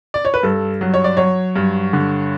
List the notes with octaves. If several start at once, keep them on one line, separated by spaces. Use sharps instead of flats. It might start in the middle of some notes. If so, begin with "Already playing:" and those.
D5
C#5
B4
G2 A4
F#3
C#5
D5
F#3 C#5
G2
D3